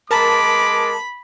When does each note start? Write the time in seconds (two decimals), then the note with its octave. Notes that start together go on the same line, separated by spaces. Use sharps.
0.11 G#3 A#4 A5 B5 D6